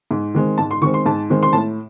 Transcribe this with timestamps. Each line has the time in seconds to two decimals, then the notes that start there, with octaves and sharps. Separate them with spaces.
0.11 G#2
0.35 D#3 G#3 C4
0.58 G#2 A5
0.71 C6
0.82 D#3 G#3 C4 C#6
0.94 C6
1.06 G#2 A5
1.30 D#3 G#3 C4
1.43 C6
1.53 A2 A5